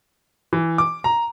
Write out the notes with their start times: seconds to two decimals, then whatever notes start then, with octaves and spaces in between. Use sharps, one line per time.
0.53 E3
0.78 D6
1.04 A#5